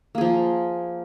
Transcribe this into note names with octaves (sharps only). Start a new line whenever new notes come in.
F3 A#3 G#4